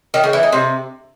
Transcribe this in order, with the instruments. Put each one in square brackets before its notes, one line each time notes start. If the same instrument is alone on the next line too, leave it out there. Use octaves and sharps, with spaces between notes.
[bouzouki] D#3
C#3
E3
D#4
C3